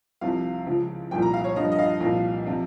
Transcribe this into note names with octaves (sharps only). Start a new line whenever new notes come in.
C2 C3 F3 F5
C#2 C#3 F3
C2 A#2 F3 G5
A#5
F5
C#5
G2 F3 D#5
D#5
F5
C2 A#2 F3
C3 F3